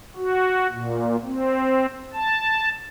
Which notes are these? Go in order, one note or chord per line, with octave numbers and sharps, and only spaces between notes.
F#4
A#2
C4
A5